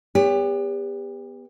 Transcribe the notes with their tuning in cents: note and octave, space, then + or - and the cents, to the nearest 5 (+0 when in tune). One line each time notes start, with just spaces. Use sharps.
B3 +0 G4 +35 C#5 +40